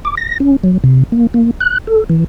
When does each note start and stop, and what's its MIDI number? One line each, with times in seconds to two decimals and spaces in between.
0.05 0.15 86
0.17 0.38 94
0.40 0.56 61
0.64 0.78 54
0.84 1.03 48
1.12 1.27 58
1.34 1.51 58
1.60 1.78 90
1.87 2.04 69
2.10 2.24 52